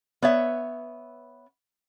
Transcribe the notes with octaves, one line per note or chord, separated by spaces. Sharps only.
B3 C#5 E5